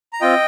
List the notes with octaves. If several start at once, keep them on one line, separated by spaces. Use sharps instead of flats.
A#5
C4 F4 D#5 G5